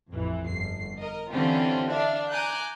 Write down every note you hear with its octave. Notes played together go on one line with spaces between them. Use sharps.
A1 F2 E3
G1 C7
A#4 D#5
D3 E3 C4 C#4 F4 G4
D4 D5 E5 F5
G#5 A#5 D6 F#6 G6